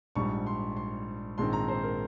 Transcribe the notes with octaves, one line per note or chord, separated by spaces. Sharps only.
A#1 G#2 G3 C#6
C6
C6
A#1 G#2 D#3 G#3 C4 C6
A#5
C5
A#4